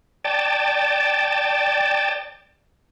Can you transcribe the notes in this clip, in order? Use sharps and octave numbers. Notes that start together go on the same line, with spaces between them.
D5 G5 A5